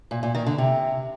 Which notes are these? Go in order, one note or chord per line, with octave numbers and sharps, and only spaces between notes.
A#2
A#2
D#3
D3
C3